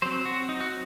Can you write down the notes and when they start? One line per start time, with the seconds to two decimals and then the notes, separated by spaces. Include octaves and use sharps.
0.02 F#3 C4 C5
0.25 F#4
0.49 D#4
0.61 F#4